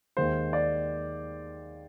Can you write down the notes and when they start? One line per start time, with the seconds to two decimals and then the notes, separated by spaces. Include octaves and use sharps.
0.17 D#2 D#3 G#3 C5
0.53 D5